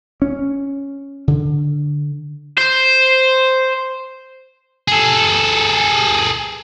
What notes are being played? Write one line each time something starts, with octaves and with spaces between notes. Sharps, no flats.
C#4
D3
C5
G#4 A4